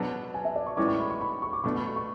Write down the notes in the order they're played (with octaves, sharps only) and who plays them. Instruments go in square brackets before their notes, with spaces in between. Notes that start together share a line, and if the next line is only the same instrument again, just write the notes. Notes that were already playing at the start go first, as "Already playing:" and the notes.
Already playing: [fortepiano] B2 F#3 B3 D4 [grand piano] A5
[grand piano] G#5
E5
D5
C#6
[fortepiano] A2 E3 G#3 C#4 [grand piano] D6
[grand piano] C#6
B5
C#6
B5
B5
C#6
D6
[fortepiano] B2 A3 D4 [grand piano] C#6
[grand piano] B5
C#6
C#6